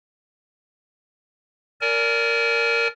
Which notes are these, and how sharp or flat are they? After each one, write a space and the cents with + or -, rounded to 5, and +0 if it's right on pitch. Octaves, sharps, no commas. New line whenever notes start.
A#4 -10 D5 -25 G#5 +25